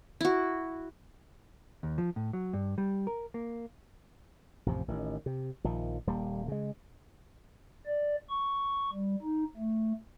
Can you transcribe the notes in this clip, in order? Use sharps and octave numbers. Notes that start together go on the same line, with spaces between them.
E4 F#4
D#2
F3
A2
F#3
G2
G3
A#4
A#3
A1 F2 C3 F3
A1 D#3
C3
A#1 D#3 F3
D#1 G3 A#3
C#3 G#3
D5
C#6
G3
D#4
A3